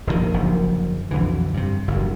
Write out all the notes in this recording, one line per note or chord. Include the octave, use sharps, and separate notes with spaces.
F1 A#1 A#2 D#3
F#1 F#2 D3 F3
B1 F2 D3 E3
G2 C3
F#1 E2 G2